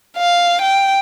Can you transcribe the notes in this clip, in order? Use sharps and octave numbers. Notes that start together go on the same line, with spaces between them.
F5
G5